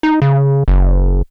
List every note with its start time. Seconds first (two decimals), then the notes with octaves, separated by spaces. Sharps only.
0.03 D#4
0.22 C#3
0.68 F#1